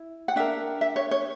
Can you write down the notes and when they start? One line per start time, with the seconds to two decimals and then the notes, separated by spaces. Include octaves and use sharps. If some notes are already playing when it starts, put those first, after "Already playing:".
Already playing: E4
0.28 F#5
0.36 D4 A#4 E5
0.81 E5
0.96 C#5
1.11 C#5